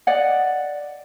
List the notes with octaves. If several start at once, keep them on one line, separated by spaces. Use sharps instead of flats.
D5 D#5 F#5